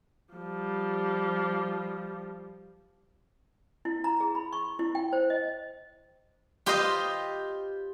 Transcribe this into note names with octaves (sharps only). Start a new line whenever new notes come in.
F3 G3
E4
A#5
G#4
B5
C#6
E4
G5
C5
D#5
F4 G4 B4 C5 D#5 F5